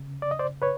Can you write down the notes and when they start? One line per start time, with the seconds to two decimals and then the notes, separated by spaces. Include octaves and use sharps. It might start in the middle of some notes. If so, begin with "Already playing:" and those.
Already playing: C#3
0.22 D5
0.31 D#5
0.39 C5 D5
0.62 B4 C#5